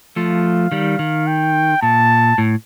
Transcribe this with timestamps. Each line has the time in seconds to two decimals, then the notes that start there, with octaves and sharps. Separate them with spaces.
0.16 F3 A3 F5
0.72 D#3 G3
0.99 D#3
1.27 G5
1.82 A#2 A5
2.38 A2